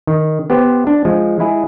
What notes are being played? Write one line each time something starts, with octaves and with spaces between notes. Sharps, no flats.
D#3
B3 G4 C5
D4
F3 G#3
G#3 E4 G#4